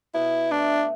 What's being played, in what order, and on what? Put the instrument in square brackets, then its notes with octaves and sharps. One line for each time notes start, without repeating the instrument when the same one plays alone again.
[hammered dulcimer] B2 [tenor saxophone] E4
[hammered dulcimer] A3 [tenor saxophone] D4